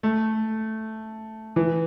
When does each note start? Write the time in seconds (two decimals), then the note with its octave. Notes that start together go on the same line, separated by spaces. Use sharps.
0.03 A3
1.56 E3